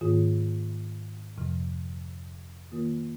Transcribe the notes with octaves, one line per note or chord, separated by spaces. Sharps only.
G#2 D#3 A#3 F4 G#4
F2 C3 F3
D#3 A#3 F4 A#4